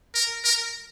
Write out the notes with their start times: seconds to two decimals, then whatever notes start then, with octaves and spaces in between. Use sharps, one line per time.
0.15 A#4
0.45 A#4